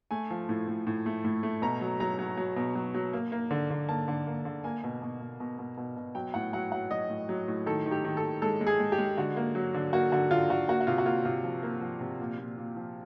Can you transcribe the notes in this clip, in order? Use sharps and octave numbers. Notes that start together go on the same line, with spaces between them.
A3 G#5
F3
A2
A2
A2
A3
A2
A3
B2 A#5
F#3
F#3 A#5
F#3
F#3
B2
F#3
F#3
A#3
A#3
D3
D3
A#3 A5
D3
A#3
D3
A#3 G#5
B2
B2
B2
B2
B2
B2
B2
F#3 G5
A2 F#5
F#3 F#5
F#3 F#5
F#3 D#5
A2
F#3
A2
D#3 A4
D#3
G4
D#3
A4
D#3
G#3 A4
G#3
G#4
G#3
G4
G#3
D3 F#4
A#3
F#3
D3
A#3 F#4
D3 F#4
D3 F4
D3 F#4
A#3 F#4
F#4
C3 F4
F#4
A#3 F4
C3 F4
F3
A#3
F3
C3
A#2
A#2
A#2
F3